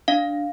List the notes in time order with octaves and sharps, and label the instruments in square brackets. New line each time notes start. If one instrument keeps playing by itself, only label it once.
[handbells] D4 F5